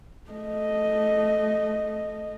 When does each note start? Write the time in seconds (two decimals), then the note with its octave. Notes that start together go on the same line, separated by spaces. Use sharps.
0.30 A3 D#5